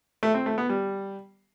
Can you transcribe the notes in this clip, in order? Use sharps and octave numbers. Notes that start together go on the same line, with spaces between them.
A3
C4
A3
B3
G3